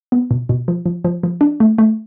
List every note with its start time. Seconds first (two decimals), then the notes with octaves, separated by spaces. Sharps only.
0.12 B3
0.31 B2
0.49 B2
0.68 F3
0.86 F3
1.04 F3
1.23 F3
1.41 D4
1.60 A3
1.78 A3